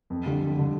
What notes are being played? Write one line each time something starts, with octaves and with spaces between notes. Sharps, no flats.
F2
D3 G3
F2
D3 G3